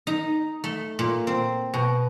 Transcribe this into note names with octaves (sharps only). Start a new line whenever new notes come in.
D#4
A3
A#2
C4
B2